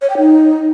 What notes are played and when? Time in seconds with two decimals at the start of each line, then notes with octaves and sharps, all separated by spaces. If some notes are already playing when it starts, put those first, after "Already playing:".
0.02 C#5
0.10 G5
0.18 D#4